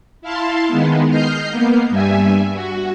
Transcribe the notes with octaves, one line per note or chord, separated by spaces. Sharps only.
E4 F5 A5 C6
D#3 G#3 B3
D#5 F6 G6 C7
A#3 B3
G2 G3 E5 G#5
F#4